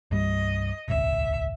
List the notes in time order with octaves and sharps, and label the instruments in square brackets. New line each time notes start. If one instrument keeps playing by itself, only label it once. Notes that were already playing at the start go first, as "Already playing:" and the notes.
[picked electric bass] C2 G2 G3 [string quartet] D#5
[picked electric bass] D#1 G#1 C#2 [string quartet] E5